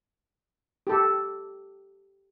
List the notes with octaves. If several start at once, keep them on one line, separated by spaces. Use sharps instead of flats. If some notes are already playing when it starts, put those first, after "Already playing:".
G4 A4